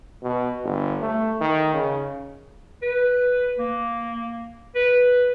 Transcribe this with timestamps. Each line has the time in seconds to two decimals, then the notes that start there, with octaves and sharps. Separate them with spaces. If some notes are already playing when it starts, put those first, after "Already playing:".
0.23 B2
0.64 G1
1.01 A3
1.41 D#3
1.74 C#3
2.82 B4
3.58 A#3
4.75 B4